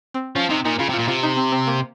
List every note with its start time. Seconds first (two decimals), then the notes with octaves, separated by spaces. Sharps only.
0.14 C4
0.35 F3 C#4
0.50 C3 D#4
0.65 A#2 D#4
0.79 C#3 F4
0.89 C3 F4
0.99 A#2
1.08 C3 F4
1.23 D#4
1.37 C4
1.52 C4
1.67 A#3